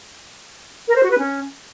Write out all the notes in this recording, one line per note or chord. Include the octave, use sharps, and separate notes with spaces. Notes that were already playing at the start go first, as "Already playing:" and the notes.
A#4
C5
F#4
B4
C#4